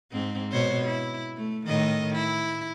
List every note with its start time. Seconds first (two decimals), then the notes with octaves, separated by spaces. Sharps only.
0.12 G#2 C4
0.52 B2 C5 C#5
0.86 E4
1.37 A3
1.66 A2 D#3 D#5
2.14 E4